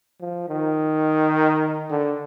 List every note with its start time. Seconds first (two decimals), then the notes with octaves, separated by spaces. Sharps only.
0.21 F3
0.49 D#3
1.90 D3